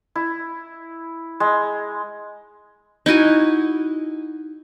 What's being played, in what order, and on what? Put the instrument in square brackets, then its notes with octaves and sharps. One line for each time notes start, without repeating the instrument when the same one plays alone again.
[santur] E4
G#3
[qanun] D#4 E4 F#4 G#5